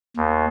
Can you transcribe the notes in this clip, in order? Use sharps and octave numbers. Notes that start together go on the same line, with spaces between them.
D#2